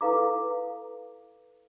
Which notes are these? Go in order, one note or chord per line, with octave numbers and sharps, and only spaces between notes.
E4 A4 B4 F5 A#5 D6